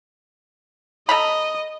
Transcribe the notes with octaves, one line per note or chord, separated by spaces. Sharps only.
A4 D#5 A#5 B5